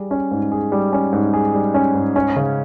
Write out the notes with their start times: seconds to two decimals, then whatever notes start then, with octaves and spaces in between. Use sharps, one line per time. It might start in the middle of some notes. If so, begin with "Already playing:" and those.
Already playing: G3 G#4
0.11 C#4
0.31 G#2
0.52 G#4
0.72 G3
0.93 C#4
1.12 G#2
1.34 G#4
1.54 G3
1.74 C#4
1.95 G#2
2.16 C#4
2.36 C#3